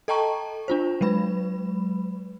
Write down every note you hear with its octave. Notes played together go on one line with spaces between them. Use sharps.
A4 D#5 G5 A5 A#5 C#6
D4 F4 C5
F#3 G#3 B4 B5